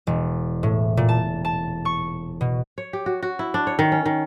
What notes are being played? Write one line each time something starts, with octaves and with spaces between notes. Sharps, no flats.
E1
A2
A#2
A5
A5
C#6
B2
C#5
G4
F#4
F#4
E4
D4
C#5
D#3
C#4
D#3